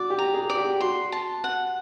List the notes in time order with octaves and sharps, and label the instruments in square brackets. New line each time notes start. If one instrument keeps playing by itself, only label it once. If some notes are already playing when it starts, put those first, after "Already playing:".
Already playing: [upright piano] F#4 [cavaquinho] D5
[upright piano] G4
[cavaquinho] A#5
[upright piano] G#4
[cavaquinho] D5
[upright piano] G4
[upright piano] F#4 [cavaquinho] C6
[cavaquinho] A5
F#5